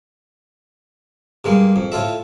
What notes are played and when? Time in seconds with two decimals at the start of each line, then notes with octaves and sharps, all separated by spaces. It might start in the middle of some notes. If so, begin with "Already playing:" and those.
1.44 G2 G#3 A#3
1.76 F2
1.92 A2 F4 A4 E5